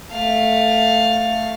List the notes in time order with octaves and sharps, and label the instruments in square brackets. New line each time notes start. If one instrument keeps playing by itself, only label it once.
[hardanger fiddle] A3 F5